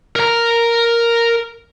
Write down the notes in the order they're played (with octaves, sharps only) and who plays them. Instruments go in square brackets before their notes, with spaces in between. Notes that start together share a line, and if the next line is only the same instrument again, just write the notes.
[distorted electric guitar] A#4 A#5